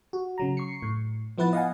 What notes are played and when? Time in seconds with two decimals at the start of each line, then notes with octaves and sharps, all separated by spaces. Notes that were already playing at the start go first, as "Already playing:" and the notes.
0.13 F#4
0.38 C#3 F#3 A#5
0.57 C#6 C7 C#7
0.82 A2
1.38 F3 B3 E4 B4 F#5 A6
1.53 D#5 F5 F#5 G#5